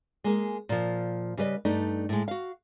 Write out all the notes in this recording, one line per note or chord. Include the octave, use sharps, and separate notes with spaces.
G#3 A#3 G#4
A#2 F3
C#3 G3 B4 D#5
G2 A3 D4 D#4
A2 G#3
F#4 F5